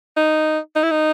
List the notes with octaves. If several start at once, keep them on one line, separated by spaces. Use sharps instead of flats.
D#4
D#4
E4
D#4